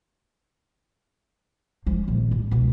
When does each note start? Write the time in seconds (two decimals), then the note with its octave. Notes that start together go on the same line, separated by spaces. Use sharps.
1.86 F3 G#3
2.08 A#1 D#3
2.31 A1
2.51 C#2 B2